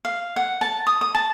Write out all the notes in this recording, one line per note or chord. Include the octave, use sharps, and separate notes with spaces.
F5
F#5
A5
D#6
D#6
A5